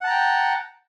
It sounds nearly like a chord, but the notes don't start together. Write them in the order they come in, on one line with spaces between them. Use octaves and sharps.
F#5 A5 A#5 G5